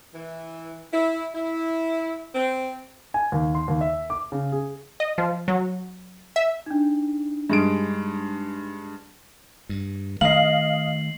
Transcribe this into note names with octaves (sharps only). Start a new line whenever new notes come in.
E3
E4
E4
C4
G#5
D#2
C6
D#2
E5
D6
C#3
G#4
D#5
F3
F#3
E5
D4 D#4
G2 G#3 D7
G2
D#3 A3 D#5 F5 C7 F#7